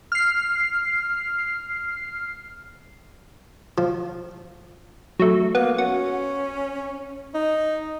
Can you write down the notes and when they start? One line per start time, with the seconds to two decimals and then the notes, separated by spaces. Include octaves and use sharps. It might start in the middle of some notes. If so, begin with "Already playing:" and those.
0.12 F6 C7
3.78 F3
5.19 F#3 A3
5.55 A#3 B3
5.78 C#4 F#4
7.35 D#4